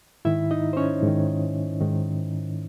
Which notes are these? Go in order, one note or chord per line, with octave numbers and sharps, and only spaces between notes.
G#2 D#3 E4 E5
D#4 D#5
C5
C#4 C#5
G#2 D#3
G#2 D#3